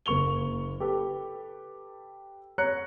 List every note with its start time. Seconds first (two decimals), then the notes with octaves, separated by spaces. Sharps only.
0.06 F#1 A#3 C#6 F7 G7
0.80 G4 A4 B4
2.58 C#5 A#5 F#6 C#7